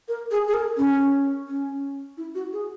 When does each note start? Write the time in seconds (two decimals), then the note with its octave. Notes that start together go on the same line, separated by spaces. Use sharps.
0.08 A#4
0.31 G#4
0.48 G#4
0.54 A#4
0.77 C#4
1.48 C#4
2.17 E4
2.35 F#4
2.53 G#4